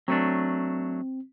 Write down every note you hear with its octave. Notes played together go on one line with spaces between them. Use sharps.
F#3 A3 C4 D4